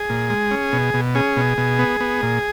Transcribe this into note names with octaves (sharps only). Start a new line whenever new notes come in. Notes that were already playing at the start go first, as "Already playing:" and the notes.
Already playing: G#4
A#2
G#3
C#4
B2
B2
C#4 G#4
B2
B2
B3
B3
A#2